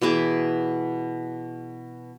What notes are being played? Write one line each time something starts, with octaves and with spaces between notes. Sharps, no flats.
B2 E3 G#4 D6